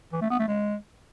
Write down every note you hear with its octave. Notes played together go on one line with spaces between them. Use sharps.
E3
A3
B3
A3
G#3